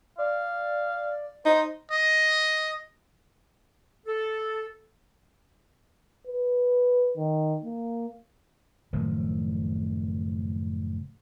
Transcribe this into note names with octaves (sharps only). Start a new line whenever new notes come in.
D5 F5
D#4 C5
D#5
A4
B4
D#3
A#3
F#1 A2 D#3 F3